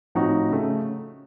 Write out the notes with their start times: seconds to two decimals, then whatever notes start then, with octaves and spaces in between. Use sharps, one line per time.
0.15 A2 F3 C4 D#4 F#4
0.51 C#3 A3